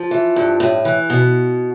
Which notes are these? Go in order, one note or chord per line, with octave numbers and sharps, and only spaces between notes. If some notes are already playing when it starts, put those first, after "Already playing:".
Already playing: F3
E3
G2
A2
E3
B2